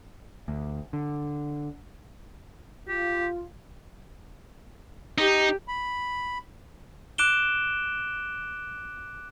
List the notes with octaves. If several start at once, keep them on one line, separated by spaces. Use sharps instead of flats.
D2
D3
F4 G4
D#4 G4
B5
D6 F#6 D7 E7 G7